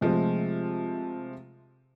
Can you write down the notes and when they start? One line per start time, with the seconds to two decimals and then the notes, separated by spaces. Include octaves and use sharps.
0.01 C3 F3 G#3 A3 C4